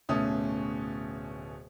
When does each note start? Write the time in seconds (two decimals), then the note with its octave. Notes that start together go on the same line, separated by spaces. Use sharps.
0.09 D1 B2 A3 C#4 D#6